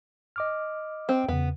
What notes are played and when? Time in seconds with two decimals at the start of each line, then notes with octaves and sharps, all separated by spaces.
0.36 D#5 D6 F6
1.09 C4
1.28 E2 C#3 B3